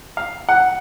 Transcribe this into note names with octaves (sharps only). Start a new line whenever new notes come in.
F5
F#5